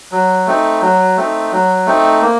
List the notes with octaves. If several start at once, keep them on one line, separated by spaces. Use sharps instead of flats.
F#3
A3 C4 D#4
F#3
A3 C4 D#4
F#3
A3 C4 D#4
A#3